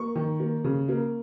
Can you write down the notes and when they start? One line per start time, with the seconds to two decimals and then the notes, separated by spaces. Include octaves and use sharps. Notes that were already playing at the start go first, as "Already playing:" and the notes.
Already playing: A#3 C#6
0.15 D#3
0.40 A#3
0.64 C#3
0.89 A#3